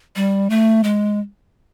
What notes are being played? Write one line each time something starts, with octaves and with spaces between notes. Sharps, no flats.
G3
A3
G#3